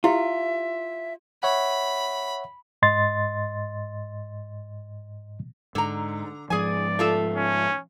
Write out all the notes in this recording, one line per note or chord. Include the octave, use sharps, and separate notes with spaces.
E4 F4 G4 E5
C#5 E5 F#5 B5
G#2 D#5 C6 A6
G#2 D3 A#5
G#2 F3 G#4 D5 G#5
A3 F4 A4
C#4